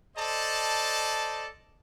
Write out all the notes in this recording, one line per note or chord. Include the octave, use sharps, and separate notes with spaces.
A4 C5 D5 D#5 A5